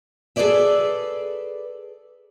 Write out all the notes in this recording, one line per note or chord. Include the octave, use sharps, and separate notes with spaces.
G#4 A4 B4 C#5 D5 E5